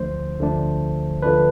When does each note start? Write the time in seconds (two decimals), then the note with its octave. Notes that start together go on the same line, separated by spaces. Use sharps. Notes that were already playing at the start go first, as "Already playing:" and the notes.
Already playing: D2 D3 F3 A3 D4 C5
0.38 D2 D3 F3 A3 D4
1.22 D3 F3 A3 D4 B4